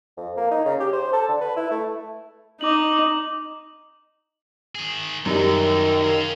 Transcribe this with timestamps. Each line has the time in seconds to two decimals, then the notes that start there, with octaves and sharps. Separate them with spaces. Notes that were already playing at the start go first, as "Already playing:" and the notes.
0.17 F2
0.37 A#3
0.51 D#4
0.65 C#3
0.80 G4
0.93 C5
1.13 A4
1.29 D3
1.41 B4
1.57 E4
1.71 A3
2.61 D#4 D6 F#7
4.75 D#3 G#4
5.26 F#2 D#3 F#3 G3 D#4
6.04 G#4 F5